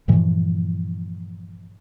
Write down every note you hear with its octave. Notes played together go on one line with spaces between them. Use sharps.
G2 A#2 E3 F3